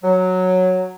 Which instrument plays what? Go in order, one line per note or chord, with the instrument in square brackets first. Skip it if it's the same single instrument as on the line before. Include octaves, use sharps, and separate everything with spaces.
[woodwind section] F#3